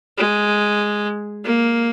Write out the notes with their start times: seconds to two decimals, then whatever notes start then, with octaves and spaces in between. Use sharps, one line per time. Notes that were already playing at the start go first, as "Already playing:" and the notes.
0.18 G#3
1.45 A#3